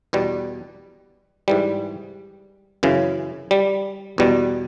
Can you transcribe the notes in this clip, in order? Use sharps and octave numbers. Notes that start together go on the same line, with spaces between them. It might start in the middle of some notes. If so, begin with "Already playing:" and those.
E2 B2 G3
G#2 E3 G3
F#2 C#3 E3
G3
E2 B2 G3